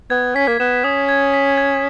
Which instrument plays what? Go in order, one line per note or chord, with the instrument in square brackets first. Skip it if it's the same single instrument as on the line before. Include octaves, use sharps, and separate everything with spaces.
[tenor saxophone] B3 [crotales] G#6
[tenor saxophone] C#4 [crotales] B6
[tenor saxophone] A#3
[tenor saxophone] B3 [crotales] E7
[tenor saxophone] C#4 [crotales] D#6
[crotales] G#6
B6
G#6